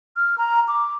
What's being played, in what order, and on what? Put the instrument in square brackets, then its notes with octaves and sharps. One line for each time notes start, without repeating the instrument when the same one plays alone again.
[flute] F6
A#5
D6